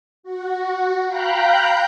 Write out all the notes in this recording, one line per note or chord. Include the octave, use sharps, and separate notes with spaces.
F#4
F5 G5 A#5 B5 F#6 G6